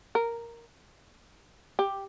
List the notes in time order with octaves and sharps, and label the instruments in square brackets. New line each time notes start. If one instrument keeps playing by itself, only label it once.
[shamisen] A#4
G4